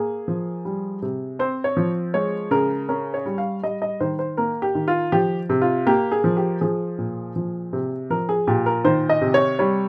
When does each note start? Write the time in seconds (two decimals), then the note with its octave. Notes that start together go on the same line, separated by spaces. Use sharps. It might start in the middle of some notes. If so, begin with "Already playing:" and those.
Already playing: A#3 G#4
0.28 F3
0.65 G3
1.02 C3
1.39 C4 C5
1.64 C#5
1.77 F3
2.14 G#3 C#5
2.51 C#3 A#4
2.89 C#4 A#4
3.14 C#5
3.26 G3
3.38 F5
3.63 G3 D#5
3.82 D#5
4.00 D#3 C5
4.19 C5
4.37 A#3 A#4
4.62 G4
4.75 D#3
4.88 F4
5.12 F3 G4
5.50 C3
5.62 F4
5.86 A#3 G4
6.12 G#4
6.24 F3
6.37 G4
6.61 F3 G#4
6.98 A#2
7.36 F3
7.73 C3
8.10 F3 A#4
8.29 G#4
8.47 A#2 G4
8.66 A#4
8.85 D#3 C5
9.09 D#5
9.21 C3
9.34 C#5
9.59 G3 C#5